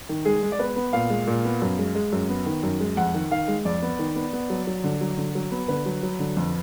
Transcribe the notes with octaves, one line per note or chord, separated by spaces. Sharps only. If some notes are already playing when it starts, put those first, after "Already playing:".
D#3
G#3 G#4
G#3
D5
B3 B4
B3
A#2 F5
G#3
A#2
B3
F#2
G#3
G#3
F#2
B3
D#3
F#2
G#3
F2 F#5
D#3
D#3 F5
G#3
F2 D5
B3
D#3
B3
B3
F#3
F#3
D3
F#3
D3
F#3
B3
D3 B4
F#3
F#3
D3
F2